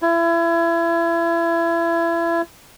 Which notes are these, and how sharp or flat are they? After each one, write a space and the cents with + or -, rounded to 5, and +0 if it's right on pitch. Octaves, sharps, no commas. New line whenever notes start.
E4 +30